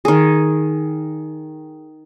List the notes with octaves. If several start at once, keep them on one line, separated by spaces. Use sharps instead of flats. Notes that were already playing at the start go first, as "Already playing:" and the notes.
D#3 G#4